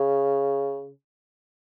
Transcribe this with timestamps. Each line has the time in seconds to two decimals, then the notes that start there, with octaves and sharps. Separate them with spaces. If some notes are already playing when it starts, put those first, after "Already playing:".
Already playing: C#3